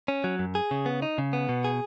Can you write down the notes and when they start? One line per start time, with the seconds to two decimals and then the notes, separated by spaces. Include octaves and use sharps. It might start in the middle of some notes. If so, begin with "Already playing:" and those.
0.08 C#4
0.24 F#3
0.39 F#2
0.55 G#4
0.71 C#3
0.86 B3
1.02 D#4
1.18 C#3
1.33 B3
1.49 B2
1.64 G#4